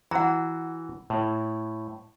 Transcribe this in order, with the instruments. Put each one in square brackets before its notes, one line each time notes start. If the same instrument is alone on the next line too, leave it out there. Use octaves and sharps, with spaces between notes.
[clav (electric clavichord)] E3 F#4 [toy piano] F#5 A#5
[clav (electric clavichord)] A2